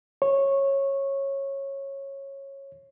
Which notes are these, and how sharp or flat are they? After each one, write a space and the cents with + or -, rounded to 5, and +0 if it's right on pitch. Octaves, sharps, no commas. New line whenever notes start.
C#5 -15